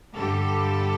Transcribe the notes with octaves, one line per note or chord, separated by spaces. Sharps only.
G2 D3 G3 G4 A4